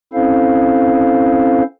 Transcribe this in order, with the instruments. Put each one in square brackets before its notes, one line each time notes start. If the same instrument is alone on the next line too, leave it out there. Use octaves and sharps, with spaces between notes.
[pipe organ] C4 C#4 E4 A4 C5 F5